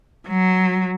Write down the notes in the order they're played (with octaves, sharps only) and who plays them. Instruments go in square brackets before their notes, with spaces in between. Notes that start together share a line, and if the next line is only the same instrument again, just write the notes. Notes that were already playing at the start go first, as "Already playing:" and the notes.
[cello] F#3